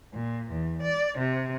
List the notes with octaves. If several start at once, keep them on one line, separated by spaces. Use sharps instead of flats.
A#2
E2
D5
C3